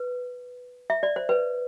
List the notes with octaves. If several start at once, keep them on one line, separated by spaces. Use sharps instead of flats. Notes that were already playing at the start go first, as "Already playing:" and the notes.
Already playing: B4
E5
D5
C5
B4